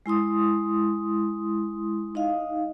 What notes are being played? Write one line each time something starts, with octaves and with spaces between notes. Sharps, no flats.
G#3 E4 C6 D#6
D#4 D#5 F5